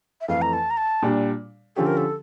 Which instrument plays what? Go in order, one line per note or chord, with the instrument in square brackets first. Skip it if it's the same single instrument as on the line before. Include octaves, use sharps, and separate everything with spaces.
[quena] E5
[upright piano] F2 E3 A3 [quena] F5
[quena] A#5
A5
A#5
A5
[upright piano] A#2 G3 D4
[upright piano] D3 F3 C#4 G4 [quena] A4
[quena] A#4
A4